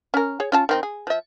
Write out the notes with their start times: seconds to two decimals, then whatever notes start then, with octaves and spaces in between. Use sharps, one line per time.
0.14 C#4 A#4
0.40 G#4 C#5
0.52 C#4 F4 A5
0.69 D#3 C4 D#4
0.83 G#4
1.07 F3 E5